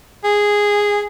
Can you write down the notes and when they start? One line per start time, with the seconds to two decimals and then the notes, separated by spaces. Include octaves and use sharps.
0.24 G#4